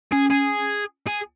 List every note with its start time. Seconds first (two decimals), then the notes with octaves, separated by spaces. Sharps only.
0.12 C#4 G#4
0.30 G#4
1.07 G#4